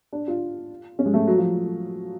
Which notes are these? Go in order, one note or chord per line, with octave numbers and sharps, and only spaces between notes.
D4
F4
C#4
G#3
A3
F#3
F3